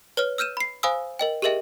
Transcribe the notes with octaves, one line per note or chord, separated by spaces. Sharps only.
B4 C#5 F6
E6 F6 G6 D#7 E7
B5 C7
C5 F5 G#5 B5 D#6 E6
A#4 D#5 G5
G4 G#4 A#4 D#5 E5 G5